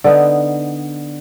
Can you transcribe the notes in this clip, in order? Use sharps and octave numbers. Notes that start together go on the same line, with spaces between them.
D3 B3 D#4